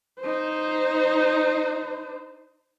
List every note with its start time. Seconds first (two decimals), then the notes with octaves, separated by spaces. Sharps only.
0.20 D#4 C5